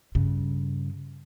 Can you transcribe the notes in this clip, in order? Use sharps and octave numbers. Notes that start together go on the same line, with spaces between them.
G2 C#3